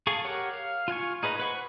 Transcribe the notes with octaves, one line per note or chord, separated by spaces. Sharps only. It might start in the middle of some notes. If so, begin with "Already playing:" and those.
G#4 A4 F5 C#6
G4 A#4 C#5 F#5
F5
F4 F5 G#5 C#6
D#4 G#4 B4 D#5
B4 C5 F#5 B5 C#6